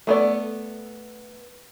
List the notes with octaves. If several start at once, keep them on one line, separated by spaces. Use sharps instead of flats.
A3 B3 D5